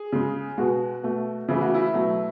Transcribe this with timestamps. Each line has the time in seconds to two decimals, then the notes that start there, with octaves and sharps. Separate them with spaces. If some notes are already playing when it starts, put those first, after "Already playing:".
Already playing: G#4
0.12 C#3 G#3
0.58 B2 G#3 F#4
1.03 B2 A3
1.48 C#3 E3 A3 E4
1.61 F#4
1.74 E4
1.94 B2 F#3 A3